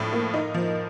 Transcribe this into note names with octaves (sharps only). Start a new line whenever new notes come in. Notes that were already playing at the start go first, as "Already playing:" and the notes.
Already playing: A2 F3 D4
A#3
D#4
F3